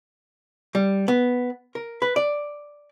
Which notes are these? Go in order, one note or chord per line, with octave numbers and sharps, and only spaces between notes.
G3
B3
A#4
B4
D5